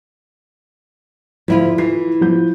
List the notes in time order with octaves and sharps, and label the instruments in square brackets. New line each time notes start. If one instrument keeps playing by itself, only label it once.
[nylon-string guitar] D2 E4 F4 [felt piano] F3
[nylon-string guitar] E3 [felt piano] F4 C7
[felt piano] F3 G6